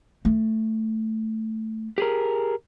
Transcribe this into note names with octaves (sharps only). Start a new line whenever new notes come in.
A3
G4 G#4 A#4